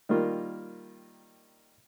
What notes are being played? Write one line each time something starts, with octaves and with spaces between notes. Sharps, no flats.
D#3 G3 A#3 F4